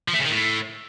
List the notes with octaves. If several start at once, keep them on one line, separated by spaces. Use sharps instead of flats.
F3
A3
C#3
D#3
A2